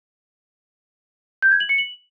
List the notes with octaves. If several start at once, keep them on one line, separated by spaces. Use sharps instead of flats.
G6
G#6
F#7
C#7
F#7